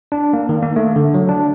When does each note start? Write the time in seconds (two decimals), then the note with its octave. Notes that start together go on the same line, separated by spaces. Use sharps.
0.12 D4
0.33 A#3
0.49 D#3
0.63 A#3
0.76 A3
0.96 D3
1.14 F#3
1.29 D4